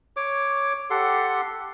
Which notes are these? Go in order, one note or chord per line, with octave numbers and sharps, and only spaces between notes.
C#5 D6
G4 A4 F#5 C6